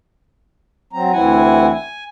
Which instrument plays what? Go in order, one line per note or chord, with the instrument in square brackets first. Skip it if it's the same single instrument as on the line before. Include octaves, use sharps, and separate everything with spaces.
[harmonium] F#3 C4 A#5
D2 E3 C4 E4 F#5 G#5
G#5